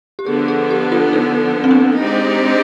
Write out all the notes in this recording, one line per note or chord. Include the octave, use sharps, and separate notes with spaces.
G4
D3 F3 B3 G#4
G#4
G4
F4
D#4
C4
D4
G#3 C4 D#4 G4 D5